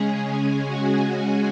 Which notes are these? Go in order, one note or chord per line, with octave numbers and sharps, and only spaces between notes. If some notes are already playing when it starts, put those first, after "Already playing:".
Already playing: C#3 G#3 C#4 G#4
G#4
F#4
G#4